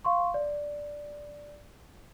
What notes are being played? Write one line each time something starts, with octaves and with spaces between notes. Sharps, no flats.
F5 C6 C#6
D5